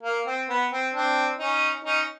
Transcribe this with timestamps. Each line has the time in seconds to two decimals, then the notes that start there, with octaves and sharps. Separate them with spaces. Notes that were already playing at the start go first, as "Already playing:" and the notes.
0.03 A#3
0.27 C4
0.49 B3
0.72 C4
0.95 C4 D4
1.39 C#4 D#4
1.85 C#4 D#4